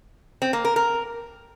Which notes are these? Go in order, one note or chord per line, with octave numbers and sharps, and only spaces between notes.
C4
A#3
A#4
A#4